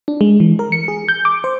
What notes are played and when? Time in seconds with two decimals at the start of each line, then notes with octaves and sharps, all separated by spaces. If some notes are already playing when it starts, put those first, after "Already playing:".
0.08 D4
0.21 G#3
0.40 E3
0.59 A#4
0.72 C#7
0.88 G#4
1.08 G6
1.25 D6
1.44 C5